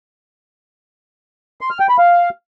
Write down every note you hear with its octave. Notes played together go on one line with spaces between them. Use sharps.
C6
F6
G5
B5
F5